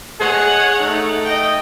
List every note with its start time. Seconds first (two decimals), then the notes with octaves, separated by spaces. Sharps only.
0.20 G#4 C#5 D#5 F#5
0.79 A3 D#4 A4
1.25 D#5 G5